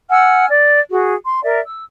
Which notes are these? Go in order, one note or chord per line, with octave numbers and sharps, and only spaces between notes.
F#5 G#5 E6 F6
D5
F#4 G#4
C6
A#4 D5 E5
E6